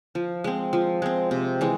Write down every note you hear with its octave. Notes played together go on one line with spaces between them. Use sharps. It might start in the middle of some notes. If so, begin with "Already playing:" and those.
F3
G#3 C4
F3
G#3 C4
C3
E3 G#3